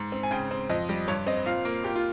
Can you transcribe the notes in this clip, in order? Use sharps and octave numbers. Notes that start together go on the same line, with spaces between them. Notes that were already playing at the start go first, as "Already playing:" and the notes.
Already playing: G#2
C4
G#5
C#3 G5
C4
F2 D#5
G3
G2 C#5
C4 D#5
A#2 F5
A#3
A#2 G4
F4